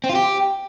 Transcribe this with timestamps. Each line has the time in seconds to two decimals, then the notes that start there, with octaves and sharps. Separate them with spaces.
0.04 C4
0.09 F4
0.15 G4